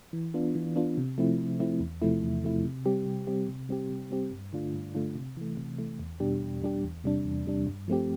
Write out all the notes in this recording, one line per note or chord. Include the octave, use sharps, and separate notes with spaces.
E3
B3 D4 F4
E3
B3 D4 F4
C3
F3 A3 C4 E4
C3
F3 A3 C4 E4
E2
C3 F3 A3 E4
E2
C3 F3 A3 E4
C3
G3 C4 G4
C3
G3 C4 G4
C3
G3 C4 G4
C3
G3 C4 G4
G2
D3 A3 D4 F4
G2
D3 A3 D4 F4
C3
E3 A3
C3
E3 A3
E2
B2 G3 D4 G4
E2
B2 G3 D4 G4
E2
C3 G3 D4
E2
C3 G3 D4
G2
F3 A3 C4 G4